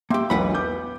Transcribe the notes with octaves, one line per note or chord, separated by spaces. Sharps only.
A#3 G4 E5 G5 C6
E1 B1 E3 B4 F#5 B5
B3 D6 G6